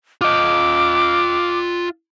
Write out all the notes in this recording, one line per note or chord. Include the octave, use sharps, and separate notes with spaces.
F4 D#5 D6